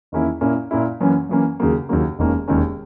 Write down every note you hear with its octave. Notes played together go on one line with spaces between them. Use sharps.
E2 D#3 A#3 C#4 E4
A#2 A#3 C#4 E4
A#2 A#3 C#4 E4
F#2 E3 A#3 C#4
F#2 E3 A#3 C#4
D#2 C#3 F#3 A#3
D#2 C#3 F#3 A#3
E1 D#2 D#3 A#3 C#4
E1 D#2 D#3 A#3 C#4